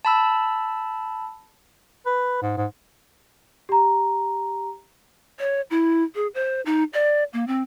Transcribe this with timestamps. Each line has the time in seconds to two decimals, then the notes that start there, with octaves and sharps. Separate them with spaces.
0.05 A5 B5 E6
2.06 B4
2.42 G#2
2.57 G#2
3.69 G4 A#5
5.39 C#5
5.70 E4
6.15 G#4
6.35 C5
6.66 D#4
6.93 D5
7.33 A#3
7.47 C4